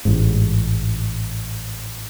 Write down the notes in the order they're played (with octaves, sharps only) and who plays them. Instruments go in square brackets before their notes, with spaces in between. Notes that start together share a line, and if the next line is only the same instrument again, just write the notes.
[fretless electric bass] A1 G#2